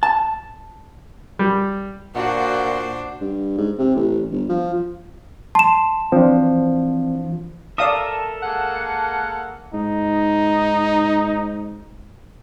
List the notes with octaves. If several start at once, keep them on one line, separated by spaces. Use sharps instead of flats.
A5
G3
A#2 D4 F#4 C5 F#5
G2
G#2
C3
A1
G1
F3
A5 C6 E7
E3 F3 C4 D4
A4 A#4 D5 E5 F5 A5 D#6
G#3 A#3 F#5
G#2 D#4